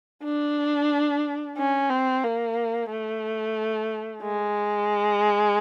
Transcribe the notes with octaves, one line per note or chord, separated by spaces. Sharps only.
D4
C#4
C4
A#3
A3
G#3